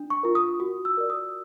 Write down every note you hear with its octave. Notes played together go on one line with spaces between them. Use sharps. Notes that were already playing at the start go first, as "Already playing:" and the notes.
Already playing: D4
C#6
F4 A#4
D#6
F#4 D#6
E6
A#4 D5
D#6